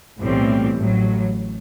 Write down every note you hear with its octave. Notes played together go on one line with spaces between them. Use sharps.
B1 A2 E3 G3 C4
A1 A2 F#3